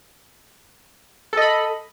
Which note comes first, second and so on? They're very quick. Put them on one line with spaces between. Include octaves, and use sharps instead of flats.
A4 D#5 B5